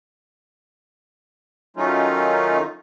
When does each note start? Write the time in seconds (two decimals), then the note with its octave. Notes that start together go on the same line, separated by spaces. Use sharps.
1.77 D#3 F#3 A3 C#4 D#4 F4